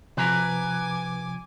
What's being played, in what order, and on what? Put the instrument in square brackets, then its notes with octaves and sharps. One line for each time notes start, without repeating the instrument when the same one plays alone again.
[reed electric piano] C3 F3 [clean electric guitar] B4 A#5 [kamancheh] G#5 D6